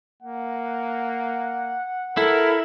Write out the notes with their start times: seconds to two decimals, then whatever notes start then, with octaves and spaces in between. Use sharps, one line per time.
0.23 A#3 F#5
2.17 E4 A4 A#4